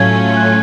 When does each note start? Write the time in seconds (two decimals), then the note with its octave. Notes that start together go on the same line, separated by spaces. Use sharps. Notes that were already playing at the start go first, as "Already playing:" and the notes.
Already playing: A2 F#3 A3 C#4 F4 G#6
0.37 F#6